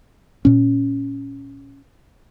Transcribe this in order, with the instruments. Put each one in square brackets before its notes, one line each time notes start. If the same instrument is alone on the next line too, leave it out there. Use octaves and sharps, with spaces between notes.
[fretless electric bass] A#2 C#4